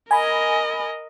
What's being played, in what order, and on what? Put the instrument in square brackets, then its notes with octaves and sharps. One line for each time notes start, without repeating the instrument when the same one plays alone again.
[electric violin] A#4 D#5 [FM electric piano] G#5 B5